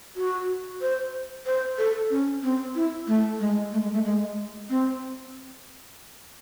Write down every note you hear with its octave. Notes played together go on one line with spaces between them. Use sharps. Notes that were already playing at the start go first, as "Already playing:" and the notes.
F#4
C5
C5
A4
C#4
C4
E4
A3
G#3
A3
G#3
A3
G#3
C4